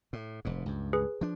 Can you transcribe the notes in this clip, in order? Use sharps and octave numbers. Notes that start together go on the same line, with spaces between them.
A2
F1 G#2
C#2 G2
G#4 B4
F3 D4